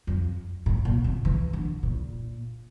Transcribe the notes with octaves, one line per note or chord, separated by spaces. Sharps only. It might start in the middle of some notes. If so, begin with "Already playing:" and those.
F2
A2
A#2
C3
E3
D3
A#2